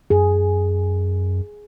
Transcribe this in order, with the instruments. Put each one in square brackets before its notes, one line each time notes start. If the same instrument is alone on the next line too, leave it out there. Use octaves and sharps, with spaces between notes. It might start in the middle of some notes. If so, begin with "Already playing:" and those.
[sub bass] F#2 [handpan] G#4